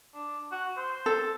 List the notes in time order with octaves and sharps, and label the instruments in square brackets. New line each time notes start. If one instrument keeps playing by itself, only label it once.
[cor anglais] D4
F#4
C5
[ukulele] A4